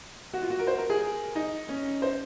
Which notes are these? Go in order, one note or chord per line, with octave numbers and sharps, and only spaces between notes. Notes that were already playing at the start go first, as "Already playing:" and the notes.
F#4
F4
F#4
A#4
C5
A#4
G#4
D#4
C#4
C5